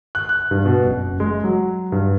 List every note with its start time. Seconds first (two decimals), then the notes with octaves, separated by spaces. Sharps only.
0.15 F#6
0.29 F#6
0.51 G2
0.65 B2
0.86 F#1
1.20 G#3
1.44 F#3
1.92 G2